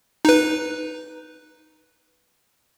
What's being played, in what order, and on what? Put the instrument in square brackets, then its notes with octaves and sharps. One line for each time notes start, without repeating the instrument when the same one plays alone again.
[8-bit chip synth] D#4 B4